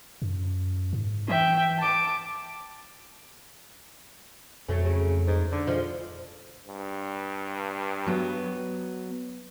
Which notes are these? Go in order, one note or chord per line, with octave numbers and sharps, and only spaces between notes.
F#2
G#2
E3 E5 G5
A5 D6
F2 F#3 A3 C#4
C#3
G#2
D3
F3 G#3
G2
F#3 B3